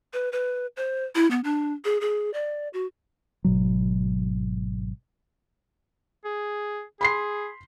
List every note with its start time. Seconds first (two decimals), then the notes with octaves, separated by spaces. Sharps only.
0.13 B4
0.32 B4
0.77 C5
1.15 E4
1.31 B3
1.44 D4
1.85 G#4
2.01 G#4
2.34 D5
2.73 F#4
3.44 G#1 B2 F#3
6.25 G#4
7.01 G#4 B5 C6 C7